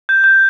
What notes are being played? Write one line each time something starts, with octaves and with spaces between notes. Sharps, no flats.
G6
G6